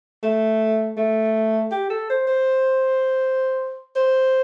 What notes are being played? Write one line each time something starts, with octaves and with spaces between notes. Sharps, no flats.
A3
A3
G4
A4
C5
C5
C5